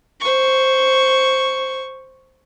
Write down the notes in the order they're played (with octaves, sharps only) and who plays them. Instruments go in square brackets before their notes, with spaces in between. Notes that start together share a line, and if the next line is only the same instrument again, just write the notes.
[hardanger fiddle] C5 C#6